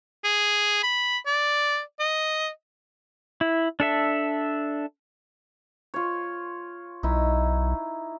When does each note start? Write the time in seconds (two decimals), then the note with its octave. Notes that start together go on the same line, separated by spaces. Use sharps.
0.24 G#4
0.83 B5
1.26 D5
2.00 D#5
3.41 E4
3.80 D4 A4 E5
5.94 F4 C#5
7.03 B1 D#4 E4